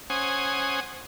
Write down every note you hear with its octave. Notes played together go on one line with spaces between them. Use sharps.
C#4 C5 F#5 G#5 D#6